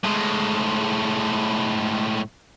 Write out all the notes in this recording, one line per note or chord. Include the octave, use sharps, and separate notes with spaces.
A2 G#3